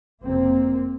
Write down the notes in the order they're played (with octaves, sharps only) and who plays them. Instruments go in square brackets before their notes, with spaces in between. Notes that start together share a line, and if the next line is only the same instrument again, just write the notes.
[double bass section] F#1 F2 C3 A#3 C4